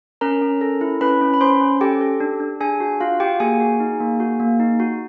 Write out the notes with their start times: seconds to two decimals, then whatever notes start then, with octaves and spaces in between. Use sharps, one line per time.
0.21 C#4 A#4 A#5
0.42 C#4
0.61 A4
0.81 E4
1.01 C#4 B4 B5
1.21 C#4
1.34 B5
1.41 C#4 C5 C6
1.61 C#4
1.81 G4 A4 G5
2.01 A4
2.20 D4
2.40 D4
2.60 D4 G#4 G#5
2.80 F#4
3.00 F4 F#4 F5
3.20 F#4 G4 G5
3.40 A#3 G#4 G#5
3.60 F#4
3.80 D#4
4.00 A#3
4.20 F#4
4.40 A#3
4.60 D#4
4.80 F#4